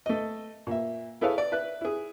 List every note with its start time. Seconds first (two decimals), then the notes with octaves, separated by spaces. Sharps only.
0.06 A3 D#5
0.67 A#2 E5
1.21 E4 G#4 A4 B4 C#5 F5
1.38 D5
1.52 B4 E5 F#6
1.81 E4 G#4